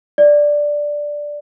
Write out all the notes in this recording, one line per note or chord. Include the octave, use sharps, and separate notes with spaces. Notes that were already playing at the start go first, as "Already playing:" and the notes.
D5